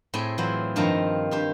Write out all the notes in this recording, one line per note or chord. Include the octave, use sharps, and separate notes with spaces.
A2 C4 G#4 E5 G#5
E3 F#3 E4 F4 C5
G2 D#3 F3 C4 F5 A#5
G2 G4 C5